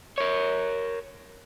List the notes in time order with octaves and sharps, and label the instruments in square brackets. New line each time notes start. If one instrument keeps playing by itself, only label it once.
[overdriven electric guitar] A#4 C#5